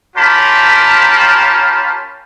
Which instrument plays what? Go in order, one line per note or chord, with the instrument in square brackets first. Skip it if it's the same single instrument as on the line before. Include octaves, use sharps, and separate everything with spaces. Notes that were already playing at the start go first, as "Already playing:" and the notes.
[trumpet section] C#4 F4 G4 A#4 A5 B5